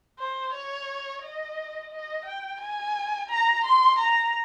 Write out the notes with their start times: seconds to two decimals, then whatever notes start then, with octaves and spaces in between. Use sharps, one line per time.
0.19 C5
0.53 C#5
1.22 D#5
1.91 D#5
2.25 G5
2.60 G#5
3.29 A#5
3.65 C6
3.99 A#5